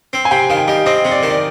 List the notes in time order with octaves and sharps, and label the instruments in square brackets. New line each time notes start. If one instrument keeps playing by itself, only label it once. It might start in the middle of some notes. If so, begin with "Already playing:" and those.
[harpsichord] C4
[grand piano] G#5
[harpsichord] C3 [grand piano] G5
[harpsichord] D#3 [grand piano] F5
[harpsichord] G3 [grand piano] D#5
[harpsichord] C4 [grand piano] D#5
[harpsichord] C3
[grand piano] D5
[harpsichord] D#3
[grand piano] D5